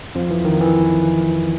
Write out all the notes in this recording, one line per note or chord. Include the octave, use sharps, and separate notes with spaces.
F2 F3
E3
D#3
E3